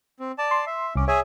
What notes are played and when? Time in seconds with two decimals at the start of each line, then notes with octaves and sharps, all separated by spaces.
0.20 C4
0.38 D5 A5
0.51 C6
0.66 E5
0.96 C2 C#4 D6
1.08 G#4 C#5 E5 G#5